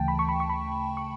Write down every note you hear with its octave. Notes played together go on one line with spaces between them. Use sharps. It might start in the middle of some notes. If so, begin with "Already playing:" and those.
Already playing: D2 C#3 E3 A3 G5 A5
B5
C#6
B5
C#6
B5
C#6